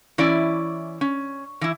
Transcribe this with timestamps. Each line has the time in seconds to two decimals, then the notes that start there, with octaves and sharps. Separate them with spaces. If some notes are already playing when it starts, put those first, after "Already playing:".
0.18 E3 C#4 E4 D5
1.01 C#4
1.61 E3 E4